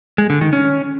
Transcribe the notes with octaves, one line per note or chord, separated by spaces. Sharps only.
G#3
D3
D#3
C#4